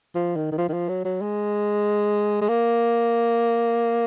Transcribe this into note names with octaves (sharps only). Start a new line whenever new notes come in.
F3
D#3
D#3
F3
D#3
F3
F#3
F#3
G#3
G#3
A#3